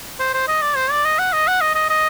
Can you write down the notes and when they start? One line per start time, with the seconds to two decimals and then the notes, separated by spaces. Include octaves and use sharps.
0.20 C5
0.34 C5
0.48 D#5
0.62 D5
0.76 C5
0.91 D5
1.05 D#5
1.19 F#5
1.33 D#5
1.48 F#5
1.61 D#5
1.75 D#5
1.90 D#5